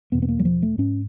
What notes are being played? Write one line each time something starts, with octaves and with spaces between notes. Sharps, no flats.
E2 B2 B3
B3
A#3
F#3
F3
A3
G#2 C#4